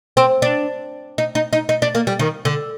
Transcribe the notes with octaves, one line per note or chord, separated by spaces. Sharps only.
C4
D4
D#4
D#4
D#4
D#4
D4
A#3
G3
D#3
D3